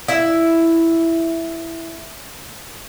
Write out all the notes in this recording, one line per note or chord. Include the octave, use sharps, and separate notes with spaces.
E4 E5